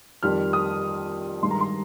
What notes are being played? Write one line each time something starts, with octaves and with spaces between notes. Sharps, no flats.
F2 D#3 G3 F6
D#6
G2 D#3 G#3 C6
A#5
C6